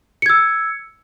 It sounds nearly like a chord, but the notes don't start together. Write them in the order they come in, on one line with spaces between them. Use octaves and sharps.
C#7 G#6 E6